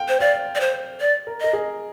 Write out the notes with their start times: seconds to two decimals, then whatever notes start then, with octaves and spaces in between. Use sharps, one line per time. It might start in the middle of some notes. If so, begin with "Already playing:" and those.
Already playing: F5 G5
0.08 C5
0.20 D5 F5
0.55 D5
0.60 C5
1.01 D5
1.27 A#4
1.41 A#4 D#5
1.53 G#4